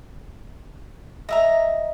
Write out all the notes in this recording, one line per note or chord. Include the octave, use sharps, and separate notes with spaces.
D#5 E5 A#5